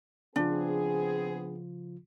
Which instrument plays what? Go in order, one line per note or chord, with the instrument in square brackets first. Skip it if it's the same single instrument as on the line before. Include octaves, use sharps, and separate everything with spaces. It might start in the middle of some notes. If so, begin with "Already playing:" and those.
[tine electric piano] C#3 F3 F4 [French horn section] B3 C4 G#4 [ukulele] D4